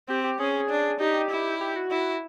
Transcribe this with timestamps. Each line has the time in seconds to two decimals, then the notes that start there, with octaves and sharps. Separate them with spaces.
0.09 C4 G4
0.24 G4
0.39 C#4 G#4
0.70 D4
1.00 D#4 G4
1.30 E4
1.61 G4
1.76 F#4
1.91 E4